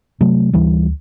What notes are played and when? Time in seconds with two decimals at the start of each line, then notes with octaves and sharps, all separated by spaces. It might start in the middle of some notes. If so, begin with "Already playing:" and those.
0.21 C3 F#3 A3
0.53 D2 E3 G3